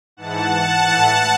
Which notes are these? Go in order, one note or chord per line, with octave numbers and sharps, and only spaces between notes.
G#2 E3 F#5 A5
A2 E3